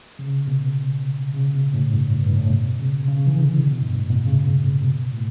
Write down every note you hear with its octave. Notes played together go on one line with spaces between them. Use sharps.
C#3
B2
C#3
B2
A2
G2
A2
G2
A2
B2
C#3
C#3
E3
D3
B2
G2
A2
B2
C#3
B2
A2